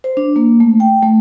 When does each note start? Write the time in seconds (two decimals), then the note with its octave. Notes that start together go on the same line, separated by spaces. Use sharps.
0.04 C5
0.17 D4
0.36 A#3
0.60 A3
0.80 G5
1.03 A3